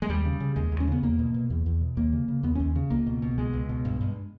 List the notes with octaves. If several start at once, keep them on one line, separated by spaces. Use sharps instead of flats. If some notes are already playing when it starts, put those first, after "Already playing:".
G#3
D#2 G3
C#3
C#3
D#2 G#3
D#2
C#4
C#3 B3
E2 A#3
B2
B2
E2
E2
B2
D#2 A#3
C#3
C#3
D#2 B3
D#2 C#4
C#3
C#2 A#3
B2
B2
C#2 G#3
C#2
B2
G2
G2